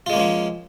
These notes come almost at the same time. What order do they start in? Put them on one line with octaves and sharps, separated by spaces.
F4 G#3 A#3 C#4 F3